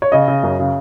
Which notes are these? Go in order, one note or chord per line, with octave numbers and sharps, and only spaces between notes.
C#5
C#3 D#5
C#3
F#2
C#3